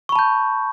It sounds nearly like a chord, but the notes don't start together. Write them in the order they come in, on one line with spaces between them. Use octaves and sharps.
C#6 B5 A5 G6